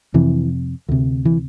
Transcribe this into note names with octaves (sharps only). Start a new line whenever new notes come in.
F2 C3 E3
D2 C3
E3